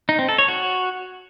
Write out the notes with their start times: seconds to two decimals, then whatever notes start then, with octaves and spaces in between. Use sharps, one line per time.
0.09 D#4
0.19 C4
0.29 A4
0.38 C#5
0.48 F#4